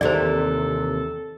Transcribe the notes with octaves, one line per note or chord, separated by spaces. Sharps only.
D#2 C3 E3 A4 C5 D5